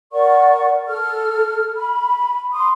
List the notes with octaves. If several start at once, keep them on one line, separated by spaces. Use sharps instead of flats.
A#4 D5 F#5 C#6
A4 F6
B5
C6 D#6